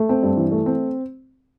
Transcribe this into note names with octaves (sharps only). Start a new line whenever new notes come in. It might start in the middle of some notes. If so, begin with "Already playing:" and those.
Already playing: A3
C4
G2
E3
A3
C4